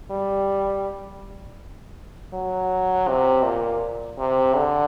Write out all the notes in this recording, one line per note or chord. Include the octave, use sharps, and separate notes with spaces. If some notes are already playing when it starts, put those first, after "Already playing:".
G3
F#3
C3
A#2
C3
D3